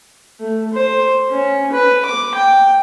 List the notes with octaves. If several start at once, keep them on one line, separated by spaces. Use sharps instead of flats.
A3
C5
C#4
B4
D6
G5